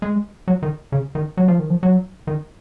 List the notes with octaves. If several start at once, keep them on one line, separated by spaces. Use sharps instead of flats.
G#3
F#3
D#3
C#3
D#3
F#3
F3
D#3
F3
F#3
D#3